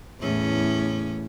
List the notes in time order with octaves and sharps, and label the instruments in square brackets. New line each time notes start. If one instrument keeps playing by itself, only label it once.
[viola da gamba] E2 A2 C#4